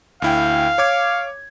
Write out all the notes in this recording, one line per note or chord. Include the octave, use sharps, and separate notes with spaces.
D2 E4 F5 G5
C#5 D6 G#6